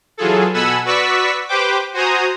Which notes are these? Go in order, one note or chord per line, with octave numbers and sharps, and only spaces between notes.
E3 F#3 F4 G#4 A4
B2 A4 F#5 G#5 B5 E6
F#4 B4 D5 C#6 E6 B6
G4 B4 C5 G5 D6
F#4 C5 G#5 A#5 D#6